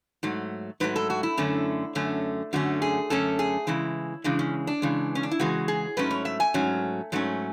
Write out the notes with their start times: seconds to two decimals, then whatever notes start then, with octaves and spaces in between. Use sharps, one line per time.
0.23 G#2 F#3 A3
0.80 G#2 F#3 A3 B4
0.96 A4
1.10 F#4
1.23 E4
1.37 F#2 D3 A3 C#4
1.95 F#2 D3 A3 C#4
2.53 F#2 D3 A3 C#4 F#4
2.82 G#4
3.10 F#2 D3 A3 C#4 A4
3.39 G#4
3.67 C#3 E3 G#3 E4
4.24 C#3 E3 G#3 D4
4.39 C#4
4.67 D4
4.82 C#3 E3 G#3
5.15 C#4
5.23 D4
5.31 E4
5.39 C#3 E3 G#3 F#4
5.68 G#4
5.97 G#2 F#3 A3 C#4 B4
6.10 C#5
6.25 E5
6.40 G#5
6.54 G#2 F#3 A3 C#4
7.12 G#2 F#3 A3 C#4